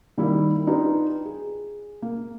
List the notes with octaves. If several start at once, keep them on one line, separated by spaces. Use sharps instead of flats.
D#3 G3 A#3 E4 G4
D4 D#4 F4 G4 B4
G#4
A#3